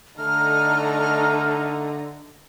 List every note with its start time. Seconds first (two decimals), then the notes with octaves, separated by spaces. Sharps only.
0.18 D3 A3 D#4 A#5 F6